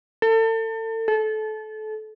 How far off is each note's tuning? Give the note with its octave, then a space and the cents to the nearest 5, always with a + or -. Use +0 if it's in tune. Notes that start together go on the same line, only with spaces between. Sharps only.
A4 +35
A4 -25